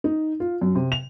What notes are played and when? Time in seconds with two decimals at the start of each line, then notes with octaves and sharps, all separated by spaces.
0.04 D#4
0.40 F4
0.61 F#2
0.75 C3
0.92 F7